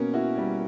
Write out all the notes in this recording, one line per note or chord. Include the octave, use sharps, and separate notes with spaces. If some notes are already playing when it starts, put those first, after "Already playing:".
Already playing: B2 A#3 C#4 A#4
E4 F#4
G3